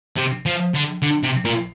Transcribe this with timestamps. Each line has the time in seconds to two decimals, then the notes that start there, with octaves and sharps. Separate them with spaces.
0.17 C3
0.46 F3
0.74 D3
1.02 D3
1.23 C3
1.45 A#2